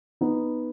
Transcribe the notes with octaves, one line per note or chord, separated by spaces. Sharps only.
B3 D#4